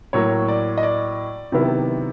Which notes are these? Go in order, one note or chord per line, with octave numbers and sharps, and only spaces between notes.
A2 F#3 A#3 C#5
D5
D#5
D5
C3 D#3 F#3 B3 E4